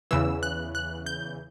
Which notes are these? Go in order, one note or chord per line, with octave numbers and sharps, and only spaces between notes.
E2 C#3 E3 E6
F#6
F#6
G6